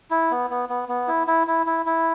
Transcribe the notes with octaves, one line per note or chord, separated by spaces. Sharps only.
E4
B3
B3
B3
B3
E4
E4
E4
E4
E4